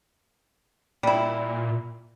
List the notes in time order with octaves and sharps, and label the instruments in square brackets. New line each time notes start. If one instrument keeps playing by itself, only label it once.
[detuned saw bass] A#2 [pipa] G3 E4